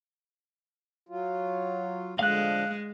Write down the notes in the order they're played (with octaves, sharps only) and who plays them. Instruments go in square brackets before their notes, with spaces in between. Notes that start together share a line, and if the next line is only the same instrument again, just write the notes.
[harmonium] F#3 F4
[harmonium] D3 F3 [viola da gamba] G#3 [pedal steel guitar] F5 F#6